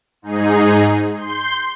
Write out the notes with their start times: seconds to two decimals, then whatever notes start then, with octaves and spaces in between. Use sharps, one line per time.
0.22 G#2 D#4 G#4
1.18 C6 G6